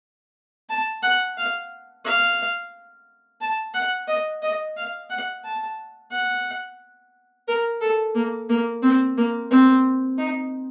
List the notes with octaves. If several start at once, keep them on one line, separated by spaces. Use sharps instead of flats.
A5
F#5
F5
F5
A5
F#5
D#5
D#5
F5
F#5
A5
F#5
A#4
A4
A#3
A#3
C4
A#3
C4
D#4